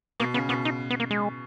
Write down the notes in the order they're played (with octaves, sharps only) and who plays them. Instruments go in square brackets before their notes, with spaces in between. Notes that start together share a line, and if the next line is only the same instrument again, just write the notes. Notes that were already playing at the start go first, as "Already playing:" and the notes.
[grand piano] B2 [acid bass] A#3
[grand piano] C#3 [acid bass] B3
[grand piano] B2 [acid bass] B3
[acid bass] D#4
B3
A#3
G#3